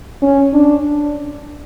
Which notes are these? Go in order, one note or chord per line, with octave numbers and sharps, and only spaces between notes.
C#4
D4